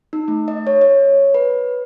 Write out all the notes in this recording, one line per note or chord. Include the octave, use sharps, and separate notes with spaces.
D#4
A3
D#5
C#5
C#5
B4